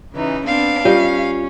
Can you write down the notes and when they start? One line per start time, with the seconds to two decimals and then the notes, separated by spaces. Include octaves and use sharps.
0.13 C#3 E3 D#4
0.47 B3 C4 D4 F5
0.85 G3 C#4 F4 D#5 G5